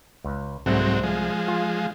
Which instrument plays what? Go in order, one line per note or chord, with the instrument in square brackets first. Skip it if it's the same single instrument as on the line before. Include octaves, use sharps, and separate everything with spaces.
[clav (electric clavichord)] C#2
[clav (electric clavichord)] C2 A3 F#5 [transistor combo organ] G#2 F#3 C4
[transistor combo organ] F3 G#3
[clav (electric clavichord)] F4